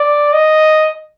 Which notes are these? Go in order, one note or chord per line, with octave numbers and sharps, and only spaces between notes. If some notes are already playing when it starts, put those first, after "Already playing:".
Already playing: D5
D#5